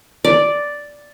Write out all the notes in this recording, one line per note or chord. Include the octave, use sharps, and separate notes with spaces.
D5